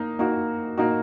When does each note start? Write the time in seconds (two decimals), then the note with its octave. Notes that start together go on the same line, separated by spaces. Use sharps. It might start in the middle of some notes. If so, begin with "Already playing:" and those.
Already playing: A#3 D#4
0.19 A#3 D#4 F#4
0.78 A#3 D#4 F#4